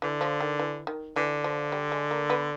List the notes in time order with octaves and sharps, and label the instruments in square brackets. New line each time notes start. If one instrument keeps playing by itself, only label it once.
[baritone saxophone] D3 [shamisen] E3
[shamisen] F3
D#3
E3
D#3
[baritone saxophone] D3 [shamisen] E3
[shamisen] F3
G3
G#3
A#3
B3